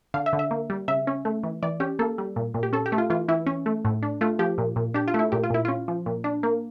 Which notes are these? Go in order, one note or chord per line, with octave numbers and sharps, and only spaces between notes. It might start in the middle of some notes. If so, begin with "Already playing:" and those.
D3 F5
E5
D3
E5
A#3
G3
C#3 E5
C#4
A3
E3
E3 D5
C#4 G4
A#3 A4
G3
A#2
A#2
G4
C#4 A4
G4
A3
F4
E3 F4
E3 E4
C#4
A3
A2
D4
A3 F4
F3 G4
A#2
A#2
D4 G4
F4
A3 E4
A#2 G4
F4
A#2 E4
C#4 F4
F3
A#2
D4
A#3